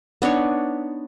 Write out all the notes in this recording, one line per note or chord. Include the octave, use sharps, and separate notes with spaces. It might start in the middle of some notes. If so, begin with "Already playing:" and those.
B3 D4 D#4 C#5